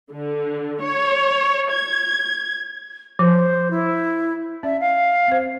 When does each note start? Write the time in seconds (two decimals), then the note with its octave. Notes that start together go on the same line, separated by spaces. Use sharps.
0.11 D3
0.82 C#5
1.71 G#6
3.19 F3 C5
3.70 E4
4.63 C#4 D5 E5
4.80 F5
5.28 C4 C5